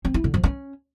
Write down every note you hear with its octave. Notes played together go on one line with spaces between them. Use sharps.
C4
E4
D3
F3
C#4